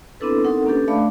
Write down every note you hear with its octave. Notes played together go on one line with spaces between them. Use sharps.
B3 C4 D4 E4 A4 B4
C4 D#4 A4 A#4 F#5
A#3 C#4 D4 G4 A4 B4
A3 D4 D5 E5 F5 B5